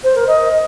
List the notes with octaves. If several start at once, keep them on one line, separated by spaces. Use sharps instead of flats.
C5
A#4
D#5